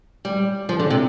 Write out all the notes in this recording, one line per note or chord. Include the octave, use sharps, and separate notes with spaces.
G3
F3
D3
C3